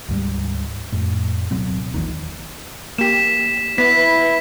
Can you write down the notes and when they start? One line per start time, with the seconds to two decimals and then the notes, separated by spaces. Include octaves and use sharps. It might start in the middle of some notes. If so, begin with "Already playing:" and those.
0.09 D2 G#2 G3
0.93 F2 A2
1.51 D1 B2 F#3 C4
1.94 A#1 E2 A#2 D#3
2.98 A#3 G4 B6 E7
3.78 B3 E4 B4 B6